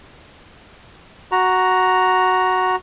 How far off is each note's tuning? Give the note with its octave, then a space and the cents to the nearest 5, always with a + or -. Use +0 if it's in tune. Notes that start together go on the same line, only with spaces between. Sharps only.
F#4 +0 A#5 +0